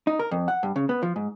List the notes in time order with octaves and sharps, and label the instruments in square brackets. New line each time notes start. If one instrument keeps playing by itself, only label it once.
[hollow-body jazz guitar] D#4
A#4
F2
F#5
G2
C#3
B3
F3
G#2